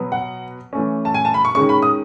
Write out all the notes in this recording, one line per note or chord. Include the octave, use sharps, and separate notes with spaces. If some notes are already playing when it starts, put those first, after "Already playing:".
Already playing: B2 F#3 B3
F#5
E3 A3 C#4
A5
G#5
A5
B5
C#6
D#3 G#3 C#4 C#6
B5
D#6